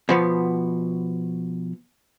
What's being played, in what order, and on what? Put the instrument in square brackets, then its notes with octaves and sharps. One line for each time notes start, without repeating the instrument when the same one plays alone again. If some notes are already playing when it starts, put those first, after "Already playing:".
[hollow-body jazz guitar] B2 F3 B3